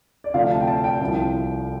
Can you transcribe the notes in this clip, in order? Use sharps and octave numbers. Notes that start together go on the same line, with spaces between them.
D5
D2 C3 F3 F5
A5
G5
A5
G5
C2 C3 F3